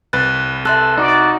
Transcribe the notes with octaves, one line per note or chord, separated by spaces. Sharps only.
C2 B4 F#6 A6
A4 E5 C6 F#6
D#4 F#4 D5